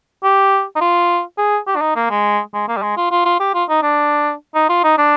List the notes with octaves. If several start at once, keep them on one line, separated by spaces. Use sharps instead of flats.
G4
D#4
F4
G#4
G4
D4
D#4
A#3
G#3
G#3
A#3
G3
G#3
F4
F4
F4
G4
F4
D#4
D4
D#4
F4
D#4
D4